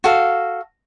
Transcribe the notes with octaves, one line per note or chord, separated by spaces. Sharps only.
F#4 A4 F5